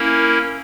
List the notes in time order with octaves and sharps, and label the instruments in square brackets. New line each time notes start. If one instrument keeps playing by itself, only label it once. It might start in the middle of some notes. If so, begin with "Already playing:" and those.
Already playing: [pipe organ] A#3 C#4 E4 A#4